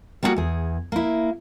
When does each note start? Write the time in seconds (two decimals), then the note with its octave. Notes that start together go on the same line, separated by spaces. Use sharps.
0.23 G3 A#3 B3 C#4 F#4 G#4
0.36 E2 G#4
0.92 A#3 E4